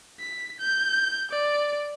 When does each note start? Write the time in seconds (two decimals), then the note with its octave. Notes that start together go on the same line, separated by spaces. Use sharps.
0.20 B6
0.60 G6
1.31 D5